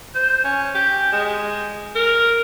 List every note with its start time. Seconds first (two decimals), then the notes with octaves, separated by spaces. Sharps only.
0.14 C5
0.44 C#4
0.75 G4
1.12 G#3
1.95 A#4